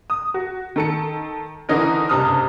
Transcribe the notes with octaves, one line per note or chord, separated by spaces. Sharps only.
D#6
F#4
D#3 A4 C#7
D3 E3 C#4 D#4 A#4
F#1 G2 C3 A5 D#6 F6